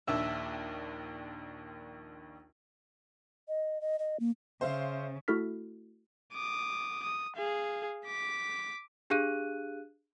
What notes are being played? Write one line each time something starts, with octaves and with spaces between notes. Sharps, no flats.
A#1 D#2 D4 E5
D#5
D#5
D#5
A#3
C#3 C5 E5 F5
A3 E4 F#4 A4 F6 B6
D6 D#6
D#6
G#4 F5
D6 B6
D4 G4 G#4 F5 F#6 D#7